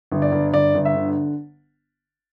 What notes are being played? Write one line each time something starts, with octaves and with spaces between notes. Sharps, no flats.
G1
D5
G1
G1 D5
G1
E5
D3